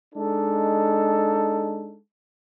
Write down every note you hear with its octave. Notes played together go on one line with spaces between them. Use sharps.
G#3 D4 D#4 A4